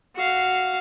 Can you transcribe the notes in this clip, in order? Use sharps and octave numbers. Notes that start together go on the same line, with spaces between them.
F#4 F5